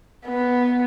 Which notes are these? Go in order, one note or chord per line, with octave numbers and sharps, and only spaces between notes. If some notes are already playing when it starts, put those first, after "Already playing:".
B3